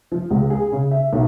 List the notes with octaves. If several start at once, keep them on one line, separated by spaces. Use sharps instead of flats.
F3
C#2
G#4
C#3
E5
B1